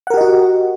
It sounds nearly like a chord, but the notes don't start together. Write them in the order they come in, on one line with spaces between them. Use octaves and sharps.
F#5 A#4 G4 D#5 F#4